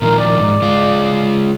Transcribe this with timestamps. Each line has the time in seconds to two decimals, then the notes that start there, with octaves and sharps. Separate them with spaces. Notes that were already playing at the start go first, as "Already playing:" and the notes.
0.02 A#2 D#3 F3 A#4
0.19 D5
0.40 G#2
0.62 G#3 F4